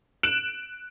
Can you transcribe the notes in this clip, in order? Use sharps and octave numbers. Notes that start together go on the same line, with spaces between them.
F#6 D7 E7 F#7